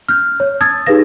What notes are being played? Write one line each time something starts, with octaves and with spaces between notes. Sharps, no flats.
F6 G6
C#5
A5 D#6 E6 G#6 A6
D#4 G4 G#4 B4 F5 A#6